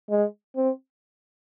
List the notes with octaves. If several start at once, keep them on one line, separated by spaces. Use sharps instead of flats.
G#3
C4